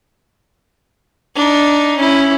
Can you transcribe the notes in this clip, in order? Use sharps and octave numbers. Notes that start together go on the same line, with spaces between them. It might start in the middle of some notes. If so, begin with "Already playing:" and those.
D4 D#4
C#4 E4